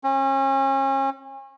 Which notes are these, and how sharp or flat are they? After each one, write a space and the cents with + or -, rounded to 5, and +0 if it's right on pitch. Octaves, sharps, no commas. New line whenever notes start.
C#4 -35